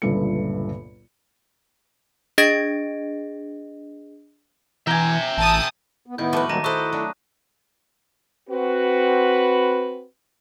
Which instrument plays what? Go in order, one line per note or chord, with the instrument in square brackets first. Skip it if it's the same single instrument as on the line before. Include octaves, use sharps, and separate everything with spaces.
[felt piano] G1 C#2 G2 A#2 A4 C#7
[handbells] D4 G#4 D#5 A6 A#6 D7
[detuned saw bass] E3 [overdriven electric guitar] E5 G5 [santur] G#5 A#5
[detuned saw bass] A1 [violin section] A5 D#6
[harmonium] B3
[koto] A2 D#3 [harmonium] B3 E4 [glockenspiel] G6
[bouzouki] F3 B4 [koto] A3 F#4 [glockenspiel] D6
[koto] D#3 [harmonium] F#3 G3 A#3 [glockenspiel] A#5 A#6 D#7
[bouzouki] E4 A4 [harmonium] C5 [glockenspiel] C#6 D#6 F#6
[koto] F#3 D4 [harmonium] A3
[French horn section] C4 F#4 B4